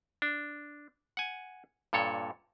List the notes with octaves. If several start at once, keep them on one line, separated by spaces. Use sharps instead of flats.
D4
F#5 G#5
G2 A#2 A4 C#5